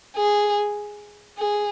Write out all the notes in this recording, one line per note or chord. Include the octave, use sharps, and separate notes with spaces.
G#4
G#4